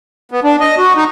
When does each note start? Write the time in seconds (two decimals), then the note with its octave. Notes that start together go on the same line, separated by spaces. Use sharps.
0.32 B3
0.44 D4
0.60 D#5
0.78 F#4
0.96 D#4